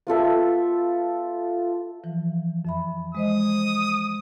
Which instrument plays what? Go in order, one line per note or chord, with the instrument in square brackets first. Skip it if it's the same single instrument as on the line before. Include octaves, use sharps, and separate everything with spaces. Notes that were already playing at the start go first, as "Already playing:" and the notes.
[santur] B3 F4 A4 E5
[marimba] E3 F3
F2 E5 B5
[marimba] G#3 C5 D#5 [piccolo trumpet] D#6